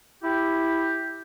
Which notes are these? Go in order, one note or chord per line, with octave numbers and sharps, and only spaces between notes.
E4 G4